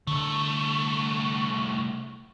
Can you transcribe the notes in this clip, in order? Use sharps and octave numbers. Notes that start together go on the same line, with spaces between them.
C2 D3 A3